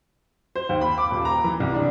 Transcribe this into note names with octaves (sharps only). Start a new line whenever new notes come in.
C5
D#2
B5
D6
D#1
A#5
E3
C2
D4